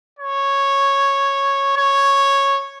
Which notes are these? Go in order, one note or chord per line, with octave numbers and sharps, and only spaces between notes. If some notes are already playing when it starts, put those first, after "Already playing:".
C#5
C#5